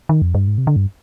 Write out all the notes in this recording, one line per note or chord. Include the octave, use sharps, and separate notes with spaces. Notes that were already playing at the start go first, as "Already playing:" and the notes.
D#3
F2
G2
G#2
C3
D3
G2